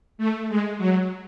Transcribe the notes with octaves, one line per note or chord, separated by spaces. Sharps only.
A3
G#3
F#3